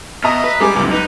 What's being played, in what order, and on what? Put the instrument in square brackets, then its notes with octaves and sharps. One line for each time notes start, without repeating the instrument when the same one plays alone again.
[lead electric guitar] B2 [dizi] D#5 [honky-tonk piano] E5 A#5 D#6
[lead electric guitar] B4
[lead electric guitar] G3 [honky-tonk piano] G#3 G4 G#4 [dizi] D6
[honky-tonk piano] C#2 F#2 [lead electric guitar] B2 G3
[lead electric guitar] D#4 [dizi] B4